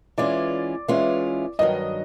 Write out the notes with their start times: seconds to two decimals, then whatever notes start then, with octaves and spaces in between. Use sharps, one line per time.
0.18 E3 G#3 C#4 F4 D5
0.88 E3 G#3 C#4 F4
1.59 G2 D#3 F#3 D#5